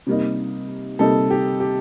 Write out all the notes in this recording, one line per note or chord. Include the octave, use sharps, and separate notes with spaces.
C3 G3 A#3 D#4
C3 G3 A#3 D#4 A4
G4
G4